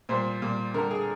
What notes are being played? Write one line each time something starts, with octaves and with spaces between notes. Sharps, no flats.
A#2 G3 C5
A#2 G3
D3 G3 A#4
G#4